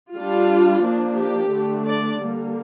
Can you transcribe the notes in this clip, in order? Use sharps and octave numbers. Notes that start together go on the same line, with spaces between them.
G3 D4 F4
F3 A#3 D4
G4
D3 A3 D4
D5
D3 G3 A#3